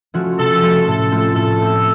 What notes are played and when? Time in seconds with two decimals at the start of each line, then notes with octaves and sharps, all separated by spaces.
0.14 F3 A3 C#4 F#4
0.38 C3 A4
0.62 F3 A3 C#4 F#4
0.87 A2 A4
1.11 A3 C4 F4
1.35 A2 A4
1.59 A3 C4 F4